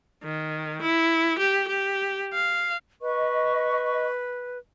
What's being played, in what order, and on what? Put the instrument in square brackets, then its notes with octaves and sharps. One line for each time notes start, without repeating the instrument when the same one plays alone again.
[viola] D#3
E4
G4
G4
F5
[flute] B4 [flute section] D#5 C#6